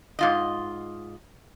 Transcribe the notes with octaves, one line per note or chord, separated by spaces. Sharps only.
G#2 F4 D#5